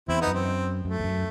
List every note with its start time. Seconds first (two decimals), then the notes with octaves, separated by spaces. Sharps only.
0.08 E2 C4 E4
0.21 B3 D#4
0.27 F#2
0.34 C4
0.85 F#2 A3
1.00 E2
1.04 F#2